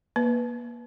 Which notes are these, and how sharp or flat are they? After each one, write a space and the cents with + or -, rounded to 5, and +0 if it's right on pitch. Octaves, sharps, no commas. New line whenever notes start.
A#3 +30 B4 +0 E5 +20